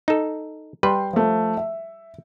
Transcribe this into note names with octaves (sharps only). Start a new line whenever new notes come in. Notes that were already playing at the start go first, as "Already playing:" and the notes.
D#4 A4
G3 B4 G5 C6
F3 A3
E5